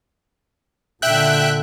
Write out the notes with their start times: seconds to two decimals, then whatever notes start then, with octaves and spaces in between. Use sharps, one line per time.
1.02 A#2 D3 E5 G5 F#6